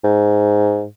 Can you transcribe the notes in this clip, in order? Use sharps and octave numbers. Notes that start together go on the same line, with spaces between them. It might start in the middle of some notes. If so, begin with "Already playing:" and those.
G#2